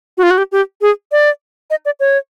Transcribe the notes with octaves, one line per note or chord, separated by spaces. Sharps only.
F#4
F4
F#4
G4
G4
G#4
D5
D#5
D5
C#5